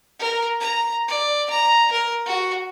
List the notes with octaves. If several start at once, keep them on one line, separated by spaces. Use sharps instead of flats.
A#4
A#5
D5
A#5
A#4
F#4